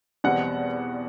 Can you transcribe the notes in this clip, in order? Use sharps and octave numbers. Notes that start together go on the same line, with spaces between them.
E2 B2 G3 C4 F#5